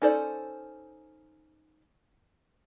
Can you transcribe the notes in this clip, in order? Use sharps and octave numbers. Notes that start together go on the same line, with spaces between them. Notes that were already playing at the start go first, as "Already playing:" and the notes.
C#4 D#4 A4 C5 D5